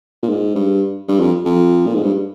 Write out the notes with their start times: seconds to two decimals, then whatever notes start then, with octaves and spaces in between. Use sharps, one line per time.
0.22 A#2
0.29 G#2
0.55 G2
1.08 G2
1.20 F2
1.45 F2
1.86 A#2
1.95 G#2
2.03 G2